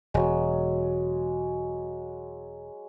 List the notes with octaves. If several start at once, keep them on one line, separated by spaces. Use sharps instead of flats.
E1 F#3 G#3